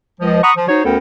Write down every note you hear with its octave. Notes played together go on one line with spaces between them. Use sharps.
C#2 F3 D#5
F#5 A#5 B5 C#6 D#6
F3
D#4 F#4 C5 C#5
D2 B3 C#4 A4 A#4 G5